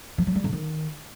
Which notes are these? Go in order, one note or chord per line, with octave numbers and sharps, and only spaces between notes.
F3
F#3
G3
C#3
D#3